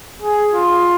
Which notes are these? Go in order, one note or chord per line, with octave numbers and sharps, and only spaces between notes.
G#4
F4